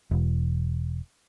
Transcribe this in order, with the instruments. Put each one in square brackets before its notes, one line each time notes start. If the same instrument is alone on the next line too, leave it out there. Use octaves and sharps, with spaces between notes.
[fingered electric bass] E1